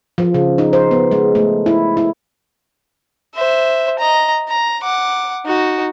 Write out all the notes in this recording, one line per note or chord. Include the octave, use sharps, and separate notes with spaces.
F3
C#3
D#4
C5
B3
G#3
A3
E4
E4
C5 E5
D#5 A#5
A#5
F#5 D6
D#4 F#4